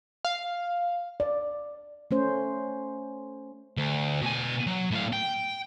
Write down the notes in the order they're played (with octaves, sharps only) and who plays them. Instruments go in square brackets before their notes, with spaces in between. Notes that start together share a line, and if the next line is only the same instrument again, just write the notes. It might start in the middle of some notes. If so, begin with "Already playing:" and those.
[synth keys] F5
[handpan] D5
A3 C#4 C5
[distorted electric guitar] D2
B2 G#5
F#3
A2 F5
G5